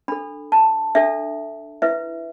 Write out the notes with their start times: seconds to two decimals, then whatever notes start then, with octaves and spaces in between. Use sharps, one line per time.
0.08 D4 A4 B5
0.52 A5
0.95 D4 A4 E5
1.82 E4 B4 E5